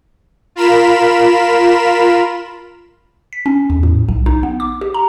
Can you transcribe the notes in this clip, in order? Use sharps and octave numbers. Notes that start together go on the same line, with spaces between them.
F4 A#4 B5 E7
B6
C#4
E2
A2
B1
D#4
B3
D6
G4
A#5